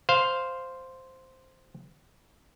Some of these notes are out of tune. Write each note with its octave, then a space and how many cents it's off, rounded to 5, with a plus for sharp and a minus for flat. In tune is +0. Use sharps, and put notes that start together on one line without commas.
C5 +0 F5 +0